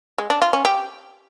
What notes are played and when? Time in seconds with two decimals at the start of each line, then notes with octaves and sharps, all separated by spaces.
0.18 G#3
0.30 D4
0.42 F4
0.53 C#4
0.65 G4